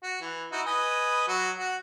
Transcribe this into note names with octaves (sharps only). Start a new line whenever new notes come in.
F#4
E3
D#4 E4 F#4
B4 D#5 G#5
F#3 F#4
F#4 F#5